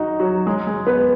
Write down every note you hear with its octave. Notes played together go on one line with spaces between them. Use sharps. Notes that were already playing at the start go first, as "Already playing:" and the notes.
Already playing: D#4 F#4 G#4 D#5
F#3 F#4
G#3 G#4
G#3 G#4
B3 B4